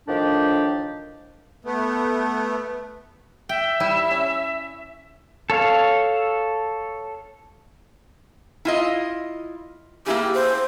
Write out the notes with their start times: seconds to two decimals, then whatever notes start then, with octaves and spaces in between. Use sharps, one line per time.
0.08 A2 D#3 F3 D4 G4
1.65 A3 B3
3.49 E5 G5
3.80 G3 E4
4.11 C#4
5.50 A4 C#5 F5
8.65 E4 F4 D#5
10.06 A#3 E4 G4 G#4
10.34 C5